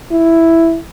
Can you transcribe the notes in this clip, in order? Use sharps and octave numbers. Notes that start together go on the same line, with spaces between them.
E4